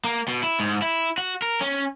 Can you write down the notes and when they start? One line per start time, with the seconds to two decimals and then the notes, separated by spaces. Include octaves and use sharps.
0.04 A#3
0.28 B2
0.43 E4
0.60 G#2
0.82 E4
1.18 F#4
1.42 A#4
1.61 C#4